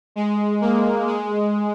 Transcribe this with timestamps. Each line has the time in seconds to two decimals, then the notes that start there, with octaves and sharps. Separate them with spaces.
0.16 G#3
0.61 A#3
1.07 G#3